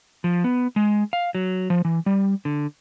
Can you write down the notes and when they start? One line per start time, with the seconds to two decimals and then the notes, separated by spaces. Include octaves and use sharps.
0.24 F3
0.44 B3
0.76 G#3
1.13 F5
1.35 F#3
1.70 F3
1.85 E3
2.06 G3
2.45 D3